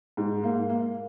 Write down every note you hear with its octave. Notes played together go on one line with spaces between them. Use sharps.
G#2
A#3
A#3